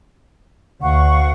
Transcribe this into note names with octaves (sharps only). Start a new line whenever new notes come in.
D2 F5 F#5 C#6